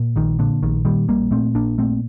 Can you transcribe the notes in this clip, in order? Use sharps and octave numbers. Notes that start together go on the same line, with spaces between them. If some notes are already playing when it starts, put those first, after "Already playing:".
Already playing: A#2
A#1 D#3
A#2 D3
A#1 D#3
A#2 D#3 G3
A#1 G3 A#3
A#2 A3 C4
A#1 A#3 D4
A#2 A3 C4